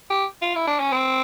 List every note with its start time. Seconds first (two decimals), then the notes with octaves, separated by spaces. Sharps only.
0.10 G4
0.42 F4
0.55 E4
0.68 D4
0.80 C#4
0.92 C4